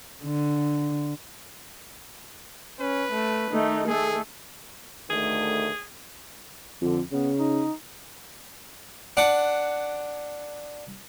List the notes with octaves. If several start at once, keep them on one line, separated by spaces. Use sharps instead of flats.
D3
C#4 B4
A3
D#3 A3 D#4
A3 G#4 A4
D2 D#3 A3 G#4
F2 D3
C#3 B3
D#4
D4 F#5 D6